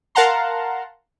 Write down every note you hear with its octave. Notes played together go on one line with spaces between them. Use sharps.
A#4 F5 F#5 A5 A#5 C6